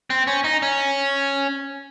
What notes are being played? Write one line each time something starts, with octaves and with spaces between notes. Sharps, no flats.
C4
C#4
D#4
C#4